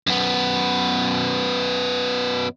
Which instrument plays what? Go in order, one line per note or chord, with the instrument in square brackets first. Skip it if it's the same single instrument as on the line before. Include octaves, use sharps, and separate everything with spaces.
[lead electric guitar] F#2 B3